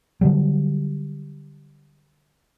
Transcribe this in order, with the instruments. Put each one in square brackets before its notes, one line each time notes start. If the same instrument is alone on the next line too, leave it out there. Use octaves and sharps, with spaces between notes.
[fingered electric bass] D3 F#3 G3